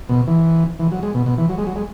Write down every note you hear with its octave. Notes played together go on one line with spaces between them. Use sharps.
B2
E3
E3
F#3
G#3
B2
B2
E3
F#3
G#3
F#3
G#3